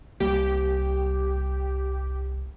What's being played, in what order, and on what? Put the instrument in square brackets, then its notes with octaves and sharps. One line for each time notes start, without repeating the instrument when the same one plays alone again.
[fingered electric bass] C2 G3 A#3 [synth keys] G4